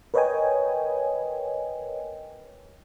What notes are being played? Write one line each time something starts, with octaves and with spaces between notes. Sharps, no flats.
A#4 B4 C#5 D#5 G5 G#5